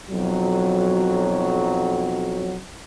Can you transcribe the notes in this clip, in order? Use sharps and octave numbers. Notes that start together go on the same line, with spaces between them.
B1 F2 F#3